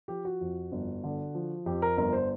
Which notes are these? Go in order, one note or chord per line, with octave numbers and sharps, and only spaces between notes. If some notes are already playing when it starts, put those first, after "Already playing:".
F3 G4
F#4
F2
G1
D3
F3
F2 G4
A#4
G1 A#4
C5